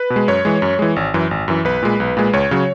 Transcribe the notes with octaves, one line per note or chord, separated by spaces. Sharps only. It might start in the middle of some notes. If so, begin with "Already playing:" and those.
Already playing: B4
B2
G#3
F#2 C#5
E3 G#3
F#2
E3 G#3
G#1
F#2 E3
G#1
F#2 E3
B1 B4
A#2 G#3
B1
A#2 G#3
C#2 C#5
C#3 F#3